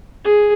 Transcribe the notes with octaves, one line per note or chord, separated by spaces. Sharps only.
G#4